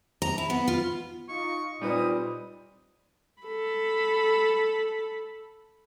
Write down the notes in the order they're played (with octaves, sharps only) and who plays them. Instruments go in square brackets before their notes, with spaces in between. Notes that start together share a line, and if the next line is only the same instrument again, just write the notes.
[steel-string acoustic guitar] A#5
E4
B3
F4
[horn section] D#4 F4 D#5 [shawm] C#6
[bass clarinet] A#2 [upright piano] G3 D#4 B4 [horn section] C4 [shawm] D#6
[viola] A4 B5